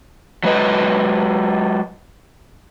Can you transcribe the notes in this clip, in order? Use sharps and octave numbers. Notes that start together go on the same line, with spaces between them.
F#3 G#3 B4 D#5